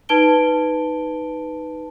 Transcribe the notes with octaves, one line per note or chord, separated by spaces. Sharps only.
D#4 B4 A5 D7 G7